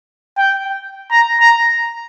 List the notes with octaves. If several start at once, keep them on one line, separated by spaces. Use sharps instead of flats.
G5
A#5
A#5